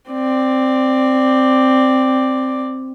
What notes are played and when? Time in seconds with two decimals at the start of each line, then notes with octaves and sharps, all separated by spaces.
0.11 C4 D5